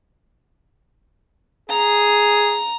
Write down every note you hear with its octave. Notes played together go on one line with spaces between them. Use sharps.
G#4 A#5